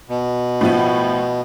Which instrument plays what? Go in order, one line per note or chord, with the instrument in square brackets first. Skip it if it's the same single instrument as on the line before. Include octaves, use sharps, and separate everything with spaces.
[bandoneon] B2
[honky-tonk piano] A2 F3 B3